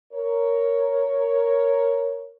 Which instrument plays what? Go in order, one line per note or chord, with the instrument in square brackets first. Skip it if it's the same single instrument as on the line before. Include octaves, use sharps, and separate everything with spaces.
[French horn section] A#4 C#5